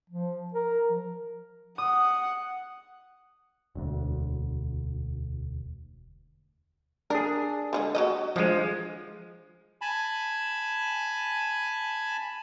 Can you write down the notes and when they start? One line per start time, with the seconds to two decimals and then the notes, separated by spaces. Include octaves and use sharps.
0.10 F3
0.54 A#4
0.89 F3
1.78 F#5 D#6
3.75 E1 D2
7.10 D4 G#4 A#4
7.73 D3 F3 G#3
7.95 F#3 B3 D#5
8.36 F3 G#3 D4 F4
9.81 G#5 A5 B5